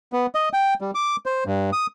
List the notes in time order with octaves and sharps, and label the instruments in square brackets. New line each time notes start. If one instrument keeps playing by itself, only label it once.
[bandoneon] B3
D#5
G5
G3
D6
C5
G2
D#6